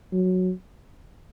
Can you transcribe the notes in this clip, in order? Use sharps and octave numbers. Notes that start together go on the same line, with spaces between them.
F#3